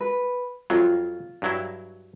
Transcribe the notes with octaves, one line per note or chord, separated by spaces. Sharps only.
B4
F2 F#3 F4
G2 F#3 E4